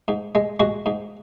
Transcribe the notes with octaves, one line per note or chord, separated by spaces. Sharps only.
G#2
G#3
G#3 F#4
G#2